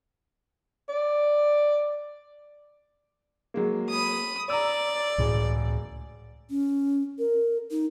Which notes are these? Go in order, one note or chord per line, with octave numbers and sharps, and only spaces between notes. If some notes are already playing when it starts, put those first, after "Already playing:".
D5
F#3 G#3 A#3
B5 D#6
D5 A#5 E6
E1 C#2 A2 C#3 G#3
C#4
A#4
D#4